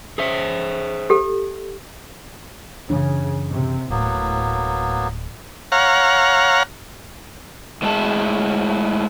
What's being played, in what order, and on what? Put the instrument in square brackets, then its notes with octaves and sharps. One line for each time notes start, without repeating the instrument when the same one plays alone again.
[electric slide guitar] G#4 C5 E5
[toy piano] G4 A4
[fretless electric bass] F#2 E3 D4 [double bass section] C#3
[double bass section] C3
[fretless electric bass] D1 [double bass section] A2 [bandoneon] F#3 A#3 B3
[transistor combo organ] C#5 F5 F#5 A#5
[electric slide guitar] A2 G#3 D4 G#4 A5